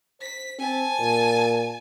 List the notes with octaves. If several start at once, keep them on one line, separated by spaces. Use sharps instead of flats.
C5 B6
C4 G#5 A5
A#2